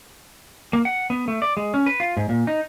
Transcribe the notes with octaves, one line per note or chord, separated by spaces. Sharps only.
A#3
F#5
B3
A3
D5
G#3
C#4
B4
F4
G#2
A#2
D#4